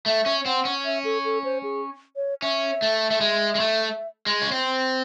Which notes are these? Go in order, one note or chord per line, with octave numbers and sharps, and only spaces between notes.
A3 E5
C#4
C4 F#5
C#4
E5
A4
A4
C5
G#4
C#5
C#4 E5
A3
A3
G#3
G#3
A3
G#3
C#4
C4